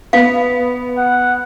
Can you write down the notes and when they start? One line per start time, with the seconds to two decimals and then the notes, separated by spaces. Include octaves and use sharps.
0.13 B3 F5
0.97 F#5